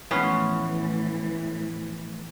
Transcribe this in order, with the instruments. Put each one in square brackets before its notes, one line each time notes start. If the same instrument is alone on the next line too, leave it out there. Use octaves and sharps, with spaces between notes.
[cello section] A2 E3 F3 [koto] B3 C#4 F4